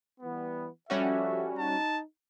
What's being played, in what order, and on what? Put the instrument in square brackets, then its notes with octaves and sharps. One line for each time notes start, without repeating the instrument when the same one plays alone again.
[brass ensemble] E3 G3 B3
[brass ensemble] F3 A4 E5 [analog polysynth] G3 C#4 F#4
[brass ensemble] D#4 [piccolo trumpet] A5